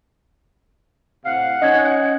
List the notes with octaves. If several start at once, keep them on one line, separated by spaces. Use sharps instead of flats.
A2 C3 F5 F#5
C#4 D#4 D#5 G#6